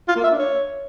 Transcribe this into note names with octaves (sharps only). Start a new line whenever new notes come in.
F4
A#3
E5
D4
C#5